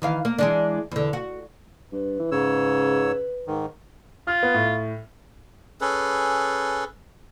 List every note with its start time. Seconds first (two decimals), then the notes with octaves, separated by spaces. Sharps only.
0.02 D#3 E3 F5
0.25 A#3
0.39 E3 G#3 D4
0.91 E2 D3
1.13 F#4
1.93 G2 B4
2.20 E3
2.32 G#2 C#3 C#5 E6
3.47 G#2 D#3
4.27 F4 F6
4.43 B3
4.54 A2
5.81 C#4 G#4 A4 B4